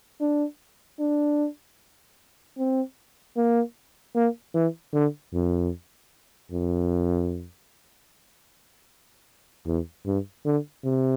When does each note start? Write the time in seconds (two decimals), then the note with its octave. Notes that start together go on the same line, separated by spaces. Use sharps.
0.21 D4
1.00 D4
2.58 C4
3.37 A#3
4.15 A#3
4.54 E3
4.94 D3
5.33 F2
6.52 F2
9.67 E2
10.06 G2
10.45 D3
10.84 C3